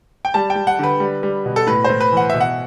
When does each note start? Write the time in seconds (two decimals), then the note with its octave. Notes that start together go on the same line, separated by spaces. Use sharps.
0.25 G5
0.34 G3 A5
0.50 G5
0.56 G3
0.67 F#5
0.79 D3 B4
1.00 G3
1.23 G3
1.46 B2
1.56 A4
1.67 A2 B4
1.84 A2 C5
2.01 B4
2.12 E3 F#5
2.30 B2 E5
2.40 F#5